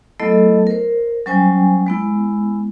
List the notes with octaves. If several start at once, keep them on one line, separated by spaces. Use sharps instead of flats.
F#3 A3 B3 E4 A4 D#5
A#4 C5
F#3 G3 C#4 C5 G5 G#5
G#3 B3 E4